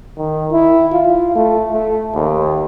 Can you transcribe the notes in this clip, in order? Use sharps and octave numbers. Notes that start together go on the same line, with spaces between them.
D#3
E4
F4
A3
A3
D#2